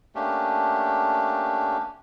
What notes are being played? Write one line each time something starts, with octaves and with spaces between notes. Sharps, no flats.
A3 A#3 C#4 D4 G4